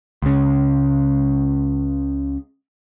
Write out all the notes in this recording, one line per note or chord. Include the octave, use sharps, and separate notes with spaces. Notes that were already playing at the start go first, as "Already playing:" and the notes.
C#2 C#3